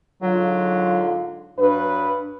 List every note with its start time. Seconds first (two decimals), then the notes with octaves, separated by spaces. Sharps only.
0.22 G#2 D3 F#3 F4
1.58 G2 F#3 B4